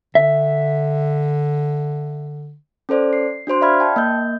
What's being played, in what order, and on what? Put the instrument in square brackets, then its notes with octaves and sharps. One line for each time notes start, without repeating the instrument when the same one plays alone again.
[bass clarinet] D3 [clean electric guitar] E5
[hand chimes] C#4 A4 C5 D5
C7
D4 F#4 C5 C6
D5 E5 F5 B5 F6 G#6
G5 A5
A#3 D#5 G6